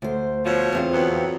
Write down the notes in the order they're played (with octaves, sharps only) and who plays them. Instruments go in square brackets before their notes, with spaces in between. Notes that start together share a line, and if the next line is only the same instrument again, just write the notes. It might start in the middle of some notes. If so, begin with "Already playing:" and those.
[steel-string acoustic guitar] D2 C5
[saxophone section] B2 F3 C#5
[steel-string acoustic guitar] E2 C4 F4
[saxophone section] F2 F#3 B3